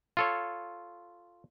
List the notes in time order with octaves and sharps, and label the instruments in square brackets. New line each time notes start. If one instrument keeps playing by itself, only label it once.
[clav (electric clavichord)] F4 A4 C#5